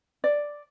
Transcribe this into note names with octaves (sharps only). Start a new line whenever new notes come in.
D5